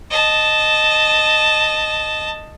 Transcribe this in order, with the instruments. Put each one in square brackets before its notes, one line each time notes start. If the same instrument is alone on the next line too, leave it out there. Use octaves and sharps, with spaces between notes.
[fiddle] D#5 A5